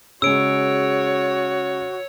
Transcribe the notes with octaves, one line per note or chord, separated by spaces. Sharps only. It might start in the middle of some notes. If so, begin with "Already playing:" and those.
C#3 G#3 F#4 C#5 E6 D7